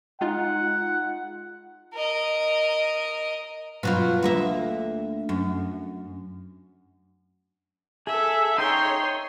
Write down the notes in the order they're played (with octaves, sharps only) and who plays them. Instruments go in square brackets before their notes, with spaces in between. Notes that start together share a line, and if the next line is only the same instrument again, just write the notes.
[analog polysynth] G#3 D#4 F4 [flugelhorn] F#5
[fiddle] A#4 D#5
[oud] B2 F#3 F4
D2 A#3 E5
F#2
[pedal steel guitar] G#4 [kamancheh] A4 E5
[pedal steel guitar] D#4 G5 [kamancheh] C#5 C6